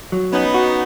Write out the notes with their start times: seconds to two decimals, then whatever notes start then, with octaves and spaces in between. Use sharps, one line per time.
0.12 F#3
0.33 B3 C#4 D#4
0.54 F#4